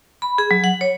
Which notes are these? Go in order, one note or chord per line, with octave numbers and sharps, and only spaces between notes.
B5
G#4
F#3
F#5
C#5